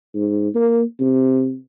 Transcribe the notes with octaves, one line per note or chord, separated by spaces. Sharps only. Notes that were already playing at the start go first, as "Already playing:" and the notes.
G#2
A#3
C3